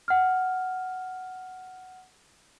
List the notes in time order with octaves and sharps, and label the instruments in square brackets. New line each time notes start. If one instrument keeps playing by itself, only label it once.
[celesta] F#5 F6